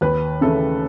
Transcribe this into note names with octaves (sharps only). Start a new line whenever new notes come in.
D#2 B4
C#3 E3 A3 A4